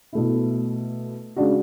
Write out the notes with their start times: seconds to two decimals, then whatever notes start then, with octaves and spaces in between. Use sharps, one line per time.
0.13 B2 A3 E4
1.36 C#3 G#3 D4 F#4